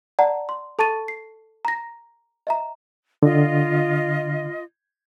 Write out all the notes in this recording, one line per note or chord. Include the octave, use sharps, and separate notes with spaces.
D5 F#5 A5 A#5
C6
A4 A5 C#6 A6 D#7
C7
A#5 A#6
D#5 E5 A#5
D3 F4 D#5